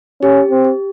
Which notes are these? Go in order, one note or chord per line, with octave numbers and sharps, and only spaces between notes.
C#4 G4
C4
G4